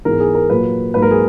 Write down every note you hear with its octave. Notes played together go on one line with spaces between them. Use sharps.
G#2 E3 G#3 B3 A#4
G#4
A#4
A#2 F#3 A#3 B4
G#2 F#3 A#3 B4
A#4
G#4